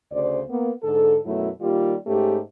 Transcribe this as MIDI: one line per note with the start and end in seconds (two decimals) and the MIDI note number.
0.11 0.40 38
0.11 0.40 49
0.11 0.40 72
0.11 0.40 74
0.48 0.70 58
0.48 0.70 59
0.81 1.16 44
0.81 1.16 50
0.81 1.16 69
1.24 1.48 42
1.24 1.48 47
1.24 1.48 54
1.24 1.48 57
1.24 1.48 64
1.60 1.94 51
1.60 1.94 55
1.60 1.94 58
1.60 1.94 65
1.60 1.94 67
2.06 2.38 44
2.06 2.38 57
2.06 2.38 61
2.06 2.38 67